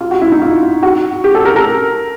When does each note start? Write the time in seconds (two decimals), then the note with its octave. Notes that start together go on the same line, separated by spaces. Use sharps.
0.01 F4
0.11 F#4
0.22 E4
0.32 D#4
0.42 F4
0.83 F#4
1.24 G4
1.35 A4
1.45 A#4
1.56 A#4